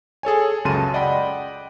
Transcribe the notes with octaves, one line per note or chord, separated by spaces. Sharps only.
G#4 A4 C#5 G#5
C#2 F#2 C#3 A5 C6 D#7
D5 D#5 F#5 G5 B5